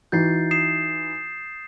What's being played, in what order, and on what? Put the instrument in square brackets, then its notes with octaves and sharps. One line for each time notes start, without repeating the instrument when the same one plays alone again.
[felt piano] E3 D#4 F#4 [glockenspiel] G6 A6 C7
[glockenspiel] D#6 C7 E7